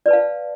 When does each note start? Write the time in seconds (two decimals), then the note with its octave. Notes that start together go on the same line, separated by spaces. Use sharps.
0.06 D5
0.08 B4
0.11 A5
0.13 F5